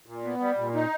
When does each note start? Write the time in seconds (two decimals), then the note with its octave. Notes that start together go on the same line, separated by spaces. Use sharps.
0.06 A#2
0.24 B3
0.40 G3
0.57 A#2
0.74 D#4